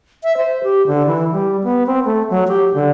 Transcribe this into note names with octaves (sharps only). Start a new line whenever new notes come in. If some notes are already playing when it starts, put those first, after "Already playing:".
E5
C5
G4
D3
E3
G3
B3
C4
A3
F#3
G4
D3